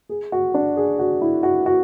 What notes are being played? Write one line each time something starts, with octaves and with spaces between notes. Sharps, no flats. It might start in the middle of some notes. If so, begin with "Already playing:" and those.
G#4
F#4
D4
G#4
F#4
E4
F#4
F#4